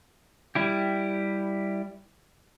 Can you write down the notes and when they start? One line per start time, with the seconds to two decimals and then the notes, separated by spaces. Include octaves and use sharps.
0.55 G3 E4 G4